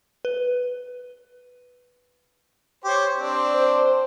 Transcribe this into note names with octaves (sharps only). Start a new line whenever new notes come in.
B4
G4 C5 C#5
C4 D4
C5